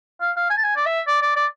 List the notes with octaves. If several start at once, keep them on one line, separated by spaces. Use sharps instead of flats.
F5
F5
G#5
A5
G#5
D5
E5
D5
D5
D5